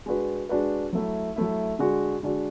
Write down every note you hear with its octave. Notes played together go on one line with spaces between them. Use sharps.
G#3 D4 F#4 B4
G#3 D4 F#4 B4
F#3 A3 E4
F#3 A3 E4
D3 G#3 D4 F#4
D3 G#3 D4 F#4